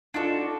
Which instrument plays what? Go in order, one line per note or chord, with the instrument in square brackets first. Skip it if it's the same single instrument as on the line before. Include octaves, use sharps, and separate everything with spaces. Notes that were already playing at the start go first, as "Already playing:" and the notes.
[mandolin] D4 F#4 A4 [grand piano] D#4 F4